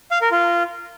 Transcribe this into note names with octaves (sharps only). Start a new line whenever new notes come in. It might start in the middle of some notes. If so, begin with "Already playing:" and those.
F5
A#4
F4